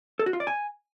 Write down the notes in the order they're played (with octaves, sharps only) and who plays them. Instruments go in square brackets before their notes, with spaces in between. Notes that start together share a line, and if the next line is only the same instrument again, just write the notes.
[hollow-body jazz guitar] A4
F#4
F4
D5
G#5